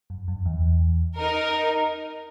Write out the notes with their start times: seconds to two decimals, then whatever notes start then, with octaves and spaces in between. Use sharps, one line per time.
0.10 F#2
0.28 F#2
0.46 E2
1.17 D#4 A#4